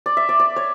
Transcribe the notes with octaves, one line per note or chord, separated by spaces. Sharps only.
D5
E5
D5
D5
C#5